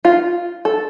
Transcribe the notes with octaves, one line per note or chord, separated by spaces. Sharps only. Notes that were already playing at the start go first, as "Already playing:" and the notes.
F4
A4